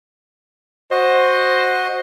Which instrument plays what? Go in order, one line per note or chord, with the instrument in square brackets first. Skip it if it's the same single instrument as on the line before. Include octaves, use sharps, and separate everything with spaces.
[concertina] F#4 D#5 [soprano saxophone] C5